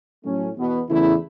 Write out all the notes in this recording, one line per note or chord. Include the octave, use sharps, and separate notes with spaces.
A2 F#3 A3 C#4
E2 B2 B3
E2 C#3 E3 A3 E4